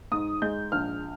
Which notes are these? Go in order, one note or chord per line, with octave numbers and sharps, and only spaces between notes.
G#2 D#6
G#3 G6
A#1 F6